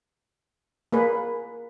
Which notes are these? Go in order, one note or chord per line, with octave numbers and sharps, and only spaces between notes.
A#3 G#4 B4